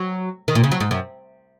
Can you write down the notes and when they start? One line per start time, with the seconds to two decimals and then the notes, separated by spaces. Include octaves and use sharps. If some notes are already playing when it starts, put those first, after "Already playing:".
Already playing: F#3
0.48 D#3
0.55 A#2
0.64 C#3
0.72 F#3
0.80 G#2
0.91 F#2